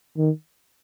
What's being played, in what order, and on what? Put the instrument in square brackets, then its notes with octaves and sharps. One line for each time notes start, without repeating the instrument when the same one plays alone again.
[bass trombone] D#3